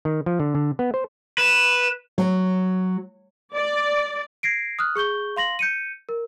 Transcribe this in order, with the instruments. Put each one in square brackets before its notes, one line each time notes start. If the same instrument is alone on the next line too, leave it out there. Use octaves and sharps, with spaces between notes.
[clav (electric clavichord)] D#3
F3
D3
D3
B3
C5
[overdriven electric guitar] B4 [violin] E7
[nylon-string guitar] F#3
[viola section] D5
[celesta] G#6 A#6 C7 D7
D#6 F6 F#6
G#4 C#6 G6 G7
F5 C6 A#6 F#7
G6 C#7 D#7
A#4